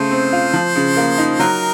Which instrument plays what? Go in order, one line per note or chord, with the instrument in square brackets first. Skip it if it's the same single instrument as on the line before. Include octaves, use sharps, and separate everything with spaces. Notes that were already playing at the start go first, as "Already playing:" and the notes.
Already playing: [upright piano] C#3 A3 [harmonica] C5
[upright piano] C4
F4
F3
C#3
A#3
D#4
[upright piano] F#3 [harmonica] A#4